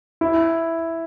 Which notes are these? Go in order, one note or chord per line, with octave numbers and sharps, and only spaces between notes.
E4